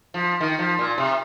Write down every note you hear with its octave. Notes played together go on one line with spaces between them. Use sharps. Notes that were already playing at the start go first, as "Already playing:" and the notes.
F3
D#3
F3
A#2
C3